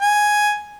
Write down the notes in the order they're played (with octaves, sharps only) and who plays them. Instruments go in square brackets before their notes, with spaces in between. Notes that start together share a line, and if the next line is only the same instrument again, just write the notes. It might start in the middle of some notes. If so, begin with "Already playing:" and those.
[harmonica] G#5